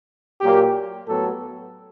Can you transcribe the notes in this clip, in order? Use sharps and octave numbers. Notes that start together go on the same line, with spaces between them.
A#2 F#3 A#3 G4
A2 F#3 B3 A4